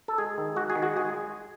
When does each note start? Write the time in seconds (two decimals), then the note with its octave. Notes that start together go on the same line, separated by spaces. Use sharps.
0.08 A4
0.18 G#3 G#4
0.38 D#3
0.56 G#3 F#4
0.70 G#4
0.75 D#3
0.83 F#4
0.94 G#3 G#4